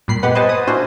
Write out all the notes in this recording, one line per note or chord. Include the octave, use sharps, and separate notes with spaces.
G2 A#2 B5 C7
G#3 B3 G4 B4 F#5
B4 C5 D#5 G#5 A5
B4 D#6
A#2 C#4 D4 E4 F#4 C5